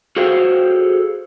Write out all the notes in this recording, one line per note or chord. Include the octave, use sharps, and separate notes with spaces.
F#4 G#4 A4 C5 F5 G5